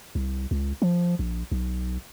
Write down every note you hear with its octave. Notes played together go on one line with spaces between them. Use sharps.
C2
C#2
F3
A#1
B1